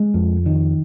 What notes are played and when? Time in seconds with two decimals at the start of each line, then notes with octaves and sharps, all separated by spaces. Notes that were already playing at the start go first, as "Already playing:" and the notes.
Already playing: G#3
0.14 F2
0.46 D#3